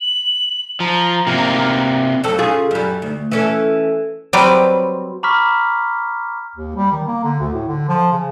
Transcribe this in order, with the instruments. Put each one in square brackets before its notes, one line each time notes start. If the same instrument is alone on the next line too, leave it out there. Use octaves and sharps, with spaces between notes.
[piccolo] F#7
[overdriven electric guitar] F3 [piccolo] A#5
[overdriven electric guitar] C3 A#3
[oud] F2 F#3 A4
C#3 F4 G#4
F#2 G3
D2
E3 C#4 A4
[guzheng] F#3 G3 C4 B4 D5
[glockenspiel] A#5 B5 C#6 D6 F6 B6
[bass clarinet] D#2
G3
D#3
A#3
D3
D2
A2
D3
F3
C#3